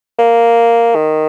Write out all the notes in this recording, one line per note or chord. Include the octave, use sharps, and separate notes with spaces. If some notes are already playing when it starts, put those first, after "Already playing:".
A#3
D#3